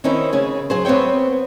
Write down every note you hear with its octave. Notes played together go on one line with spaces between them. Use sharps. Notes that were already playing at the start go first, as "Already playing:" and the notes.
D#3 C4 C#4 D#4 E4
C#3 G#4
F#3 G#4 C5
B3 C4 C5 C#5 G5